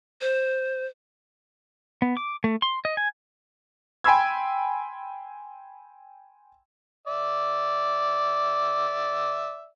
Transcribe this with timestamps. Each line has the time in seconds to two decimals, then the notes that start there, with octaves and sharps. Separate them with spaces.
0.21 C5
2.02 B3
2.17 D6
2.44 A3
2.62 C6
2.85 D#5
2.97 G#5
4.04 G5 G#5 B5 C6 E6 G#6
7.07 D5 E5